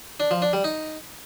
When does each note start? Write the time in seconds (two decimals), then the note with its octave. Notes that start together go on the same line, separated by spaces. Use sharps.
0.20 D4
0.31 F3
0.42 D4
0.53 G3
0.64 D#4